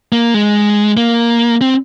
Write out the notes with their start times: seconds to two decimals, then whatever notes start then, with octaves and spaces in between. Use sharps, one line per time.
0.12 A#3
0.34 G#3
0.97 A#3
1.61 C4